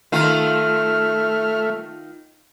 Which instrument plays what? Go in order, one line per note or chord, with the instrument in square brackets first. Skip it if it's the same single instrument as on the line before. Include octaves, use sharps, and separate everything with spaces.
[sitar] D#3 F4 [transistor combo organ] A3 [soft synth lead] F6